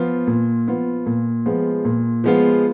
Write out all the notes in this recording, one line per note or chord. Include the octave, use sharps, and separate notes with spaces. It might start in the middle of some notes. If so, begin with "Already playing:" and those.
Already playing: F3 B3 F4
A#2
F3 B3 F4
A#2
F3 G#3 B3 F4
A#2
F3 G#3 B3 F4